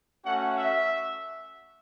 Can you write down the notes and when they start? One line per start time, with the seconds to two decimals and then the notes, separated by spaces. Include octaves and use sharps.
0.24 A3 C#4 F#4 F#5
0.56 E5